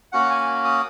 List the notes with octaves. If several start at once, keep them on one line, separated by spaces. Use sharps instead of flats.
A#3 C#4 F#4 F#5
G#5
D#6